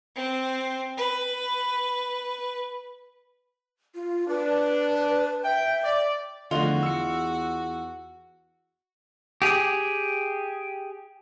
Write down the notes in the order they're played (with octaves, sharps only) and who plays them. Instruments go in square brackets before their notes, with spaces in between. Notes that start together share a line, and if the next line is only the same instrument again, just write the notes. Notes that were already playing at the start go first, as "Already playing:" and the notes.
[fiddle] C4
B4
[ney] F4
[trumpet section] D4 [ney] B4
[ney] E5 [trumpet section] G5
[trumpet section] D5
[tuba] E2 [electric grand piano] D3 F3 A3 [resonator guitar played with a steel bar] F4 D#5 [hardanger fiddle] F#4
[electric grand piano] E6 C#7
[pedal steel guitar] G4 G#4